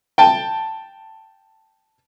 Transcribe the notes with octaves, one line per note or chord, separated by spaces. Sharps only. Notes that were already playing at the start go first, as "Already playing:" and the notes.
G5 A5